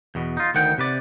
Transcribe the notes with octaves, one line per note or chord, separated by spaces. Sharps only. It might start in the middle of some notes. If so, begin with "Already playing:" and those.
E2 B2
D#4 F4
D2 D#3 F#5 G5
C3 B4 D5